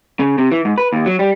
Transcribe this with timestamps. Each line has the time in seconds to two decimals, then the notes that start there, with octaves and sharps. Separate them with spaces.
0.20 C#3
0.38 C3
0.51 E3
0.65 G#2
0.78 B4
0.93 D#2
1.06 F#3
1.19 G3